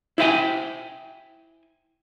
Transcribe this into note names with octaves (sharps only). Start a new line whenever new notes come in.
E4 C5 E5 F5 G5 G#5